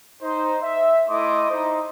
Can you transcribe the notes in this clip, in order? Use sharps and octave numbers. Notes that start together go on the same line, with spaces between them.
D#4 C5
E5
A3 E4 D#5 C6 D6 D#6
D#4 C5